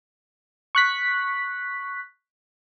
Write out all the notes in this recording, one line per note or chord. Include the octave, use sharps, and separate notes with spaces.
C#6 F#6 B6